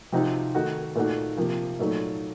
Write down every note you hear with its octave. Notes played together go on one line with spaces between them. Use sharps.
C3 F3 C4 D#4 F#4
D#3 A3 D#4 F#4
A#2 A3 D#4 F#4
C3 F3 A#3
A#2 F#3 A3 D#4